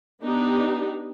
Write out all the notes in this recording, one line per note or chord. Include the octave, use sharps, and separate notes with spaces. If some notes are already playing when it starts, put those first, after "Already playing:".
B3 D4 D#4 G4